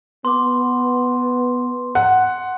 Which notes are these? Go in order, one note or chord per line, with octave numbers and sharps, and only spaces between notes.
B3 C6 D6
F#5